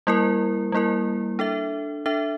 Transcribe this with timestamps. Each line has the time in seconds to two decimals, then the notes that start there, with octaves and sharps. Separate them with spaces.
0.07 G3 A#3 E4 A#4
0.72 G3 A#3 E4 A#4
1.39 D4 A4 E5
2.06 D4 A4 E5